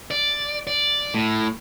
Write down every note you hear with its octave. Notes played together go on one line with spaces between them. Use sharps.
D5
D5
A2